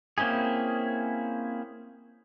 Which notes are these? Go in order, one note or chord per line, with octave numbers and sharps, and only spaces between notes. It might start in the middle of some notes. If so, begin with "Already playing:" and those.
A#3 C4 C#4 E4 G#4